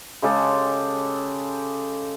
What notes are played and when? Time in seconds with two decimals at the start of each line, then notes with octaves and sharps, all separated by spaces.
0.22 C#3 G#3 G4 A4